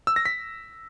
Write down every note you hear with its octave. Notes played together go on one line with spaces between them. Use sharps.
E6
A#6
B6